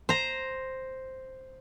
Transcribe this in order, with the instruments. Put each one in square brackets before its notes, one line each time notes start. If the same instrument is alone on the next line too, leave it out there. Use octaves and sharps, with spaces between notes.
[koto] C5 A#5